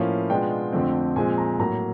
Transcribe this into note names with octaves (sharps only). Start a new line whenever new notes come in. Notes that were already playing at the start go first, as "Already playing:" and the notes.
Already playing: A2 F3 A#3 C#4 E4 F5
B2 G#3 B3 D4 F4 G5
F2 D3 F3 A3 C4
A#2 F3 G#3 C4 G#5
A#5
A2 F#3 A#3 A#5